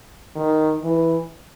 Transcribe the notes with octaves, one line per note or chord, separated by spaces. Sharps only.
D#3
E3